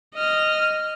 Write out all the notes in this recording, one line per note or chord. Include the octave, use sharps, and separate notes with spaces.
D#5 F6